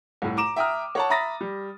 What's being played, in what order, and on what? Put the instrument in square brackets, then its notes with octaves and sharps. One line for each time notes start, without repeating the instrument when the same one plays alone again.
[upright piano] C2 A2
A#5 D6 E7
E5 G5 A#5 D#6 F6
C#5 F#5 A5
E5 A#5 B5 D#6 A6 A#6
G3